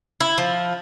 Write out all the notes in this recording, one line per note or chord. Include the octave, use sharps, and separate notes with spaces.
E4
F3